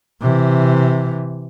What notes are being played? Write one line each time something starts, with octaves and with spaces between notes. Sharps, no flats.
C3 E3